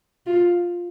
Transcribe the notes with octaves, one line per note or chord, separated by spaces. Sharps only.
F4